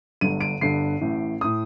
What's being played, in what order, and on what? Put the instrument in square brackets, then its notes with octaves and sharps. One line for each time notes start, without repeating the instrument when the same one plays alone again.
[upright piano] G1 G2 D3 D#7
D7
G1 G2 D3 C7
A1 A2
A2 D#6